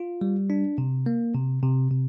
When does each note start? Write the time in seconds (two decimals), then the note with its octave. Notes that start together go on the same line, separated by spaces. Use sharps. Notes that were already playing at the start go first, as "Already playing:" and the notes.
Already playing: F4
0.21 G3
0.50 D4
0.78 C3
1.06 A#3
1.35 C3
1.62 C3
1.91 C3